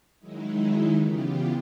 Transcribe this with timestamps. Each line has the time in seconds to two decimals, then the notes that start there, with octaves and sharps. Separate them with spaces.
0.19 D#3 F#3 G#3 D#4 E4
0.96 C#3 E3 B3 F4 G4